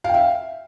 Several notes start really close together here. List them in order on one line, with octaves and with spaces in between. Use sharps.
F5 G5 E5